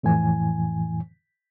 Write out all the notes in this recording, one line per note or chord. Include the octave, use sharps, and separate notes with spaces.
F2 A2 E3 G#5